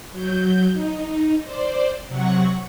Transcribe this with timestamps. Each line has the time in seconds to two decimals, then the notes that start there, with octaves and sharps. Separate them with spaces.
0.11 F#3 G6
0.73 D#4
1.44 C5 D5
2.09 C3 F#3 F#5 C#6